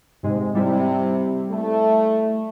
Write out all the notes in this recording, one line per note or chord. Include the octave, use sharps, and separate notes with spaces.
G#2 C3 G#3
C3 G3 E4
A3